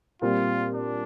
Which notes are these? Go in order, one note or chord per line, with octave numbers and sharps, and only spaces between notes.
A#2 G3 C4 F4 G4
D4